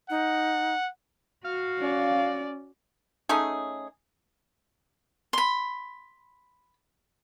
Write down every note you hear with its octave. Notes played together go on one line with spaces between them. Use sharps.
D#4 F#5
F#4 F5
C#4 D5
A3 C#4 D#4 G#4
B5 C6